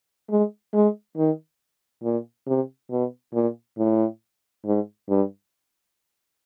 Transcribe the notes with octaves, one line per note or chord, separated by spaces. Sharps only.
G#3
G#3
D#3
A#2
C3
B2
A#2
A2
G#2
G2